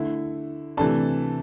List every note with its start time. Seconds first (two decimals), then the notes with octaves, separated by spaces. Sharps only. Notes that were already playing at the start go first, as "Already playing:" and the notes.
Already playing: D3 A3 E4
0.77 C3 E3 A3 D4 A5